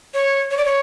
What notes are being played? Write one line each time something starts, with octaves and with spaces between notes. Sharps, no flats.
C#5
C#5
D5
C#5